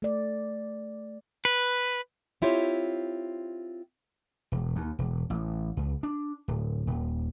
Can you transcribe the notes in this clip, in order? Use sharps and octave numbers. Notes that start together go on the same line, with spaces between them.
A3 D5
B4
C4 E4 F4 G4 C#5
E1
D#2
E1
A1
C#2
D4
D1
D#1